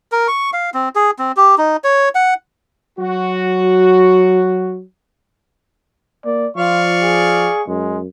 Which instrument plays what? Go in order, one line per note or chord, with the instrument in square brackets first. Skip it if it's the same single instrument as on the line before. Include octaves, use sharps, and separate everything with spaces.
[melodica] A#4
C#6
F5
C4
G#4
C4
G4
D#4
C#5
F#5
[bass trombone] F#3 [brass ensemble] F#4
[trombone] A#3 [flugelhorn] D5
[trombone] F3 [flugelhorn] F4 [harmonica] D5 F5 C#6
[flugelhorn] G#4
[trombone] F#2 [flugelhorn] G#3